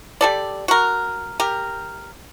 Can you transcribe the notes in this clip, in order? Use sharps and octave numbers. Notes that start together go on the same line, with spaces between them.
G3 A4 D5
F#4 A#4
G4 A#4